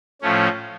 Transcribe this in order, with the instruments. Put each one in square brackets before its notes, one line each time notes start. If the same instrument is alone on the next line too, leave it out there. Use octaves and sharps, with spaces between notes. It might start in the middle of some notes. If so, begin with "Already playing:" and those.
[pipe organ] A2 F3 A3 C#4